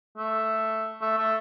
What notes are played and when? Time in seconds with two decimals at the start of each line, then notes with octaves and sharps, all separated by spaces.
0.18 A3
1.01 A3
1.17 A3